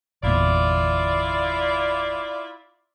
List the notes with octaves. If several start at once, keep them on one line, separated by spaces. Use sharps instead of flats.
G1 E2 A#2 E4 F4 D5